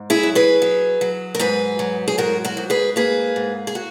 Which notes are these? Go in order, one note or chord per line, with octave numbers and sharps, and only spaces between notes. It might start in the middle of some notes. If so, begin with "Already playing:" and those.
Already playing: G#2
E4 G#4
F#3
G#4 B4
F#3
F#3
A#4
G#2 G#4 B4
F#3
G#4
G#2 F#4 A#4
F#4 A#4
G#2
G#4 B4
A#3 G#4 B4
G#2
G#4
F#4